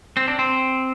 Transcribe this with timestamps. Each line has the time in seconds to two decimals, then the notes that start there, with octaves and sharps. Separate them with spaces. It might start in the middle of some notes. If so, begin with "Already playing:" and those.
0.17 C4
0.28 D4
0.39 C4